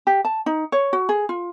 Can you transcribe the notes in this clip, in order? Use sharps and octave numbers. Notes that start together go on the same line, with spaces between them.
G4
A5
D#4
C#5
F#4
G#4
F4